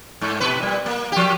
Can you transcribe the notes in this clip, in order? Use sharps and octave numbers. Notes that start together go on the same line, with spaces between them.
G#2
B2 B4
A#2 G3
A#3
F3 G4